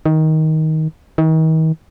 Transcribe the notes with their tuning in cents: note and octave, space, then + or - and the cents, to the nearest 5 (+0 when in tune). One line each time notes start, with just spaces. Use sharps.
D#3 +15
D#3 +40